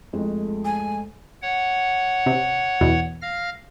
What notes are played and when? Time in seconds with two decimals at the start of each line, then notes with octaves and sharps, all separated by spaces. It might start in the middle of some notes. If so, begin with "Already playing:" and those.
0.13 F2 G#3 A3
0.65 G#5
1.42 C#5 F#5
2.26 C3
2.81 E2 B2
3.22 F5 F6 A#6